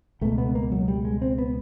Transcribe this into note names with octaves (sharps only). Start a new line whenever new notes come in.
C#2 B2 A3
B3
A#3
F#3
G3
G#3
C4
B3